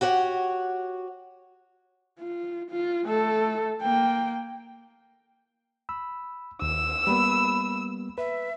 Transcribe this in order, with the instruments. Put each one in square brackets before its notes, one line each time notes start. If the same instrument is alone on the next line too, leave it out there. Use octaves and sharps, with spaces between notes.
[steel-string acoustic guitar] F#4 G4 C#5 F#5
[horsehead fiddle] F4
F4
A3 A4
A#3 G5
[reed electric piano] B5 E6
[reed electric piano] D#2 [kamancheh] E6
[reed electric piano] G3 A#3 B3 [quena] B5
[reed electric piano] B4 [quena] E5